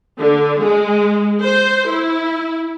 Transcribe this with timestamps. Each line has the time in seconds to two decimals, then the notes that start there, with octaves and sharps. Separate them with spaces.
0.19 D3
0.62 G#3
1.43 C5
1.88 E4